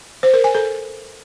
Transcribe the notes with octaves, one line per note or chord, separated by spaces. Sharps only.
C5
A#4
G#5
A4